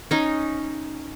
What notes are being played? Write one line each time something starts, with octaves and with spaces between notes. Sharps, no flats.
C#4 D#4